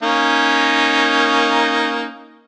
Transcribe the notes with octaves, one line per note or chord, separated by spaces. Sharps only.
A#3 C#4 D#4